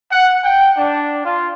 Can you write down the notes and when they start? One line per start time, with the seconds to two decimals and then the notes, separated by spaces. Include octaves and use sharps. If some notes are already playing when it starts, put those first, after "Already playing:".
0.11 F#5
0.44 G5
0.77 D4
1.24 F4